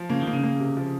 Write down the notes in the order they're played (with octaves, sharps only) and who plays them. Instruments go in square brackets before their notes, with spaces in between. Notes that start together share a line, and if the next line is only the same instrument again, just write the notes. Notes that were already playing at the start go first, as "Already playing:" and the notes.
Already playing: [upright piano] F3
[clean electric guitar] C#3 [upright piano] A#3
[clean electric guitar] D#3
[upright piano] A#3
[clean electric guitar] C#3
[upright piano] A#3
C3
F3